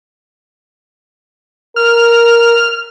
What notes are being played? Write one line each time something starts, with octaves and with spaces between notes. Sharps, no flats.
A#4 F6